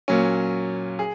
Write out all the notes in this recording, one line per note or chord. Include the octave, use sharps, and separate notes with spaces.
A#2 F#3 C#4
G#4